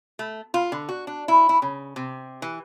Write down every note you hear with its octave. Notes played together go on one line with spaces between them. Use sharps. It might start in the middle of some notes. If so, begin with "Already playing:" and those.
A3
F4
D3
F#4
D4
E4
E4
C#3
C3
E3